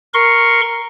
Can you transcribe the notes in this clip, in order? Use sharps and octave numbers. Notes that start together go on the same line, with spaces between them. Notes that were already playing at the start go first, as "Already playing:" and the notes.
A#4 C6 C#6